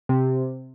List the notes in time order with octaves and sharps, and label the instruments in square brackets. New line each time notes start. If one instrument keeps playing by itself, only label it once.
[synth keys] C3